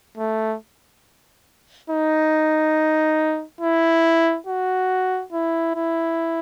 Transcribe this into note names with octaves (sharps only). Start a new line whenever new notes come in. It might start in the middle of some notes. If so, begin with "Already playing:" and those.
A3
D#4
E4
F#4
E4
E4